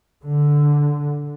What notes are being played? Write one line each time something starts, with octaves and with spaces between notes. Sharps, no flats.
D3